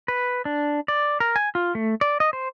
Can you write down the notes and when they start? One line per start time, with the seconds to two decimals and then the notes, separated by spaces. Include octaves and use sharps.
0.08 B4
0.45 D4
0.88 D5
1.20 A#4
1.36 G#5
1.55 F4
1.75 A3
2.01 D5
2.20 D#5
2.33 C5